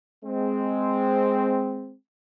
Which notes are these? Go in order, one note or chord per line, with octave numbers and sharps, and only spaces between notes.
G#3 C4